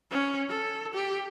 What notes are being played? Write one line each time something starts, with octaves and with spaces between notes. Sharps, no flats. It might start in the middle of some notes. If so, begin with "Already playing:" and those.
C#4
A4
G4